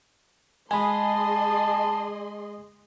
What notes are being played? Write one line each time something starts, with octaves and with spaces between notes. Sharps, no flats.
G#3 G#4 D#5 G#5 A5 B5 C6